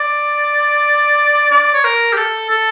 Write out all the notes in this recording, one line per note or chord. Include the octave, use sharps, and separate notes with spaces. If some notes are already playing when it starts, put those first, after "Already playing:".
Already playing: D5
D5
C#5
A#4
G4
A4
A4